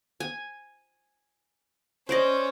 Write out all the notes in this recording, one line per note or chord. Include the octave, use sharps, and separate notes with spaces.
G#5
C#4 C5 D5 D#5